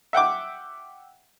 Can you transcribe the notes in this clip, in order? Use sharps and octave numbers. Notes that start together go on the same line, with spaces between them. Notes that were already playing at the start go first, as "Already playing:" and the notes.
E5 F#5 G5 D6